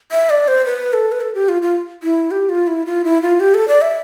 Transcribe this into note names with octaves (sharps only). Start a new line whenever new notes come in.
E5
D5
C5
B4
A4
B4
A4
G4
F4
F4
E4
G4
F4
E4
F4
E4
F4
G4
A4
D5
E5